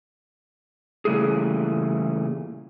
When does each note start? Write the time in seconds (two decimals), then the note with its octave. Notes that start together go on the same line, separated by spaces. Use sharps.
1.05 A#2 C#3 E3 G3 A3 G#4